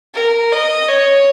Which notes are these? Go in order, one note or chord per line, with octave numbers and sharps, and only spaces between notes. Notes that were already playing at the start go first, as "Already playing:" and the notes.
A#4
D#5
C#5